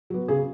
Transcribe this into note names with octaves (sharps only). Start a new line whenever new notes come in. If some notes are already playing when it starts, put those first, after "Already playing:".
F#3 B3
C#3 G#4